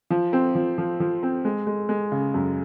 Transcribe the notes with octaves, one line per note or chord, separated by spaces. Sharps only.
F3
C4
F3
F3
F3
C4
G#3
G#3
G#3
C#3
F#2